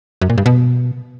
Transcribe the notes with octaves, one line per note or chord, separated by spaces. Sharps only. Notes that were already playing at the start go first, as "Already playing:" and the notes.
F#2
A#2
G2
B2